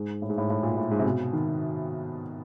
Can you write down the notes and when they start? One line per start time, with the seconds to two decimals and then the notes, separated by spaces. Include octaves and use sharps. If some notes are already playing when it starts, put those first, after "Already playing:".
Already playing: G#2
0.22 A2
0.30 G#2
0.38 A2
0.50 A2
0.63 A#2
0.77 A2
0.91 G#2
0.99 C3
1.04 B2
1.33 D#3